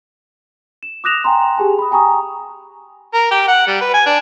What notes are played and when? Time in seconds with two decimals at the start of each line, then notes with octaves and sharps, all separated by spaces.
0.83 E7
1.04 D6 D#6 F#6 A#6 E7 F7
1.24 G5 G#5 A#5 C6
1.57 G4 G#4 G#5 A5
1.79 B5 D#6
1.91 G5 G#5 A#5 C#6 D#6
3.13 A#4
3.31 G4
3.48 F#5
3.67 G3
3.81 B4
3.94 G#5
4.06 D4